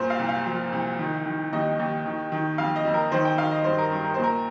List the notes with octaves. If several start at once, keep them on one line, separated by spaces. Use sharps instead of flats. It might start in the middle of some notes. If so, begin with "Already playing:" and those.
Already playing: G2 A#2 C5
F5
C2
F5
F3
C2
D#3
D#3
D#2 D#5
D#2
D#3
D#3
F2 F5
D#5
F2
A#4
D#3 C5
G5
D#3 F5
D#5
G2 C5
A#4
G2
A#4
A#2 C5
A#4